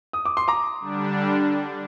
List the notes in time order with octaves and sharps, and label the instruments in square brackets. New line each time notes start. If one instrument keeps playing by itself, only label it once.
[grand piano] D#6
D6
C6
A#5 D6
[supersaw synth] D3 G3 D4